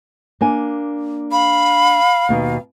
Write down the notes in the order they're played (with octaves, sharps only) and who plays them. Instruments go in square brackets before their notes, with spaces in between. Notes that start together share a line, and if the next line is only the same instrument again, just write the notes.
[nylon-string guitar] A#3 D4 G#5
[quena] F5 [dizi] B5
[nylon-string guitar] D#2 B2 D#4